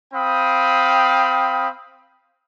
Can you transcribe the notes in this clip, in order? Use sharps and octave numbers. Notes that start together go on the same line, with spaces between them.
C4 F5 G5 B5 D#6